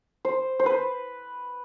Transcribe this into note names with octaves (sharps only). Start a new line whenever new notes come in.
C5
C5
B4